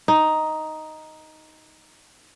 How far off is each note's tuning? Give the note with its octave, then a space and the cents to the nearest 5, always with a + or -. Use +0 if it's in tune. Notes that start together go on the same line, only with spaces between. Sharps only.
D#4 +5